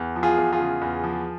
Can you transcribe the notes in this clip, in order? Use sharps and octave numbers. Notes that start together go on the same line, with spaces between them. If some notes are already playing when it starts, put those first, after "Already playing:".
Already playing: E2
F3
F4 G#4
E2
F4 G#4
C#3
E2
F3